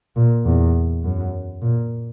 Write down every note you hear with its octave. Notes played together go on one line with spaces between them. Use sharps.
A#2
E2
F#2
A#2